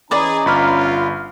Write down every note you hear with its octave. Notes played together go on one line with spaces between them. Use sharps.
E3 C#4 G#4 B4 D5 D#5 A#5
G1 F4 B5 F6